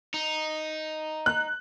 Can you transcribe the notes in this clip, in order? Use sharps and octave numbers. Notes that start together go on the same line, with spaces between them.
D#4
F#6